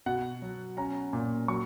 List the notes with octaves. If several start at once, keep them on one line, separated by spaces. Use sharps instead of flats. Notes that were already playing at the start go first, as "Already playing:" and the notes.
B2 F#5
F#3
C#4 A#5
A#2
F#3 C#6